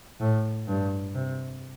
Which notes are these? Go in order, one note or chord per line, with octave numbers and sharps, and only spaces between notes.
A2
G2
C3